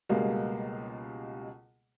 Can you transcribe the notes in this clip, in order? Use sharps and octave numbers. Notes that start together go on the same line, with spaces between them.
C#2 B2 G3 G#3 A#3